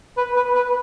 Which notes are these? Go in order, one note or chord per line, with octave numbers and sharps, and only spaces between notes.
B4
B4
B4